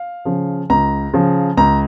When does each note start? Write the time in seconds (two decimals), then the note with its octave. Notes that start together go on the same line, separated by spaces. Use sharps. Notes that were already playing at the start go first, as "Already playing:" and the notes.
Already playing: F5
0.25 C#3 F3
0.70 C#2 A#5
1.14 C#3 F3
1.57 C#2 A#5